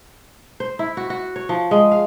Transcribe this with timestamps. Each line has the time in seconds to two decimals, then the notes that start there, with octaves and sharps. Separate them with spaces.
0.60 C5
0.79 E4
0.97 F#4
1.10 F#4
1.36 C#5
1.49 F3
1.71 G#3
1.92 F5